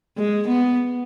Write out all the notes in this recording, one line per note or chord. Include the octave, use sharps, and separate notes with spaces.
G#3
B3